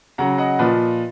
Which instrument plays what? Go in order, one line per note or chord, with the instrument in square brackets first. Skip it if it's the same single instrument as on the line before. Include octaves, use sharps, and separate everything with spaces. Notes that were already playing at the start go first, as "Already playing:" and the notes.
[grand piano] C#3 F#3 F#5 A#5
D#5 F#5
A#2 F3 B4 D#5